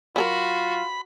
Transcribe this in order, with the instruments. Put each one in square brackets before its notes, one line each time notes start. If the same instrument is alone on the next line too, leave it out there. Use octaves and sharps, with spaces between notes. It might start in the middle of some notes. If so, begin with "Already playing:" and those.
[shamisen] F#3 G#4 A#4 [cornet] F4 [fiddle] F#4 [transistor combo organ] B5